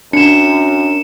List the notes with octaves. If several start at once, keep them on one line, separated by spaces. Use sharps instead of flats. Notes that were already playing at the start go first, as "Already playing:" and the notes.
F#2 D4 C#7 E7